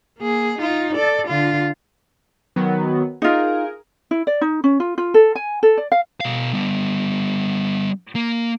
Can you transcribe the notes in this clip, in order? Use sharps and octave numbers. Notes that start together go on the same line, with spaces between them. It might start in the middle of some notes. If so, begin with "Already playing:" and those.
A#3 G#4
D#4 F4
A4 D5
D3 F4
D#3 F#3 B3
D#4 F4 G#4 A#4
E4
D5
D#4
C#4
F4
F4
A4
G#5
A4
D5
F5
B2 F5
G3 B3
A#3